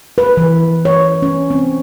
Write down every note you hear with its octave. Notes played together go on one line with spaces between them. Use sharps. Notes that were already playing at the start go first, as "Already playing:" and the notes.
B4
E3
C#5
C#4
C4